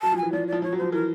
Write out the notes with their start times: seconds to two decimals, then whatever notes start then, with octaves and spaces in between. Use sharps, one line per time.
0.02 F#3 A5
0.12 F3
0.17 G#5
0.23 E3
0.32 F3 D5
0.48 F3 D5
0.62 F3 C#5
0.73 F#3
0.78 F3 C5
0.92 E3 A#4